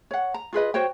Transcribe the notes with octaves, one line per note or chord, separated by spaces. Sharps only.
C#5 F#5
A#5
F4 G#4 B4 D#5
F#4 C5 C#5 G5